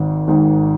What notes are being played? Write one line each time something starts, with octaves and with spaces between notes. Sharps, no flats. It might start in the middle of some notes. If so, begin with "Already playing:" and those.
Already playing: G#1 G#2 D#3
G#1 G#2 D#3